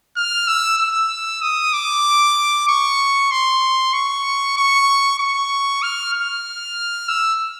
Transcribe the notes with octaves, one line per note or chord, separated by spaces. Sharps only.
F6
E6
E6
D#6
D6
C#6
C6
C#6
C#6
C#6
F6
F6
E6